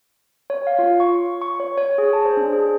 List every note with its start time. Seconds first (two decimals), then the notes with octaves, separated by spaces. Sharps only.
0.50 C#5
0.67 F5
0.79 F4
1.00 C#6
1.42 C#6
1.60 C#5
1.78 C#5
1.98 G#4
2.13 A5
2.25 C5
2.37 D4
2.53 G#4